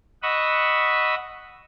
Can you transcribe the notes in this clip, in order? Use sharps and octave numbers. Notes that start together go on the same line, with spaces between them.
D#5 F#5 B5 C#6 D#6 E6